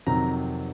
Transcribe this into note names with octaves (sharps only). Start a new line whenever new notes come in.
F2 C3 D#3 F#3 A#5